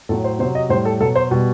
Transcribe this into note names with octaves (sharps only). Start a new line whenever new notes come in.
A2 F#3 A4
C5
C3 F#3 C5
D#5
A2 G3 C5
A4
B2 F#3 A4
C5
B2 G3